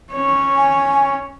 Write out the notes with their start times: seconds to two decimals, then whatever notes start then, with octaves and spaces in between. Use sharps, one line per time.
0.12 C#4 C#5
0.56 G#5